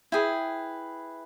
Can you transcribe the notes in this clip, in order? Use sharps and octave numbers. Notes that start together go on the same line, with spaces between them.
E4 G#4 B4 G5